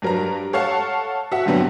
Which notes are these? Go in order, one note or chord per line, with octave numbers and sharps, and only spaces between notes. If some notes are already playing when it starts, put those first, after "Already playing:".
G2 F#3 A#4 B4 A#5
A4 C#5 F5 F#5 A5
F#4 E5 F#5
G2 A#2 D3 F#3 B3 C4